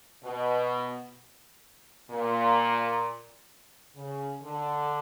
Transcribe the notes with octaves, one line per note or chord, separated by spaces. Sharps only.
B2
A#2
C#3
D3